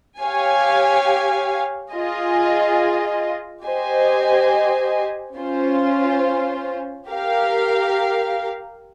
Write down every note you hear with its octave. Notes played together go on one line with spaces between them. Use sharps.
G4 C#5 F5 G#5
F4 G#4 D#5
G4 C5 D#5 G#5
C#4 F4 C5
G4 A#4 F5